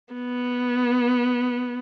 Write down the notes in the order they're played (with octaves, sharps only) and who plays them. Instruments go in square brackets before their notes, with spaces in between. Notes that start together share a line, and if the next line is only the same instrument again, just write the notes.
[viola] B3